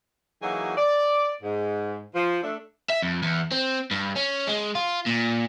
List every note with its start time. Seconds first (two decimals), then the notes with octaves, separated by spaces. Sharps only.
0.43 E3 F#3 A#3 D#4 F#4 G#4
0.77 D5
1.43 G#2
2.15 F3
2.43 A3 D4
2.90 E5
3.02 F2
3.23 E2
3.52 C4
3.91 G2
4.16 C#4
4.48 G#3
4.75 F4
5.06 A#2